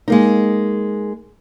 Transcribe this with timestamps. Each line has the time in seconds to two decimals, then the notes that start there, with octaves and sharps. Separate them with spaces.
0.08 G#3 A#3 D#4